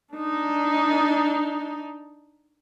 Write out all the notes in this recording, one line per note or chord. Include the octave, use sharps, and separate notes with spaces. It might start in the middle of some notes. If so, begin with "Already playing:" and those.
D4 D#4